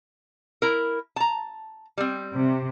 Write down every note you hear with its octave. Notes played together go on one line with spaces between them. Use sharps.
E4 A#4
A5 A#5
G3 C4
C3